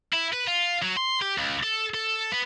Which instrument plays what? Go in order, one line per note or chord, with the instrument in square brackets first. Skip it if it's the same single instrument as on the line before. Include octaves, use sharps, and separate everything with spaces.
[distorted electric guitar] E4
B4
F4
F#3
C6
G4
C#2
A4
A4
B3